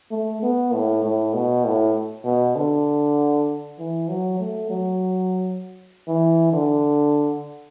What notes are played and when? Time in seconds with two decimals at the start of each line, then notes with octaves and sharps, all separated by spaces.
0.11 A3
0.43 B3
0.73 A2
1.04 A2
1.34 B2
1.65 A2
2.25 B2
2.56 D3
3.79 E3
4.09 F#3
4.40 A3
4.70 F#3
6.08 E3
6.53 D3